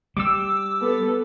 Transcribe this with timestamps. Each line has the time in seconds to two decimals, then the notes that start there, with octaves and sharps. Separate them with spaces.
0.17 G3 D6 E6
0.81 B3 A4